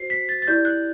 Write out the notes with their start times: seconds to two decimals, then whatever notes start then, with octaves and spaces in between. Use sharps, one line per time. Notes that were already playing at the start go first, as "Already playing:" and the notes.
Already playing: F#4 C5 C7
0.10 B6
0.29 A6
0.42 A6
0.47 E4 G4 D5 G6
0.65 F#6